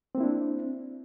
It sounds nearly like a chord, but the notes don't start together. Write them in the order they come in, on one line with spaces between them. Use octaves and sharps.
C4 A#3 E4 D4